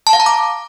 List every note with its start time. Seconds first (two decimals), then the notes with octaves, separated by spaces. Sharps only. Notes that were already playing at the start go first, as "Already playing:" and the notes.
0.07 A5
0.13 F5
0.20 A#5
0.26 D6